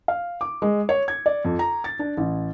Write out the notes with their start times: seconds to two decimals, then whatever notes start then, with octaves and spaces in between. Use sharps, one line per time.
0.08 F5
0.41 D6
0.62 G#3
0.89 C#5
1.08 G#6
1.26 D5
1.45 F2
1.59 A#5
1.84 A6
1.99 D4
2.17 A1